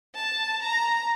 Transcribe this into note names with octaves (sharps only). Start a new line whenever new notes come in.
A5
A#5